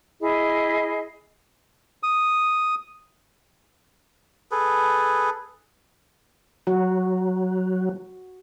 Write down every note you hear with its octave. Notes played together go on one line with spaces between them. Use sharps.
E4 G#4 D#5
D#6
G#4 A4 B4
F#3 F#4